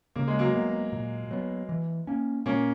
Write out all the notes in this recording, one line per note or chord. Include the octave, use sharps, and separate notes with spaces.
C#3 A#3
G#3
F#3 A#3
G#3 B3
A#2
F#3 B3
E3
A#3 C#4
A#2 A#3 C#4